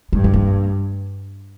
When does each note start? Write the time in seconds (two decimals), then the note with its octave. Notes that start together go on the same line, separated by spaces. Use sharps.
0.13 G2 G#3
0.24 C#4
0.34 A#3